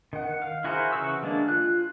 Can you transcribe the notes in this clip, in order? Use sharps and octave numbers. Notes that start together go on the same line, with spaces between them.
D#3 F#5
F5
E4 F#4 G#4 A#4 C5
C#3 E3 F#4 C#6 E6
D3 G#3 A#3 D4
F4 F#6